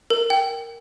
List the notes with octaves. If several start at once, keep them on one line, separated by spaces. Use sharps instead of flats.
A#4
G5